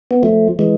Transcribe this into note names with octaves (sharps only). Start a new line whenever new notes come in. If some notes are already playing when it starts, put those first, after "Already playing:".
B3
F3 A3
E3 G#3